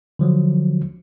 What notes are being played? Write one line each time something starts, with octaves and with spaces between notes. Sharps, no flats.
D3 F3 F#3